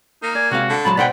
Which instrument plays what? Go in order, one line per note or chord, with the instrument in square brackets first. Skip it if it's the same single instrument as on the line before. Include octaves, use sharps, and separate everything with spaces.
[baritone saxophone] A#3 [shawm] D#4
[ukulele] D5 [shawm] G#5
[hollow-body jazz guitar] C3 G#3 F5 [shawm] F#4
[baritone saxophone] D3
[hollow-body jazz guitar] A#2 F#3 G#3 [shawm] A5 [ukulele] B5
[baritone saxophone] G#2 [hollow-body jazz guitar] B2 F#5 G5 [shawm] B4 [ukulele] C5 D5